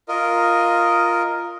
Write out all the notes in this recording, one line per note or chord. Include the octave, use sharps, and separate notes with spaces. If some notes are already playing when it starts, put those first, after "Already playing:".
F4 A#4 D#5